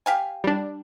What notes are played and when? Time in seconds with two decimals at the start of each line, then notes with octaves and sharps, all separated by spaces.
0.06 G4 F5 G#5
0.44 G3 D4